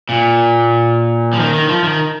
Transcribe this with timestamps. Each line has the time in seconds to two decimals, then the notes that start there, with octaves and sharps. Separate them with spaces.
0.09 A#2
1.33 F3
1.40 D#3
1.54 D#3
1.68 F3
1.84 D#3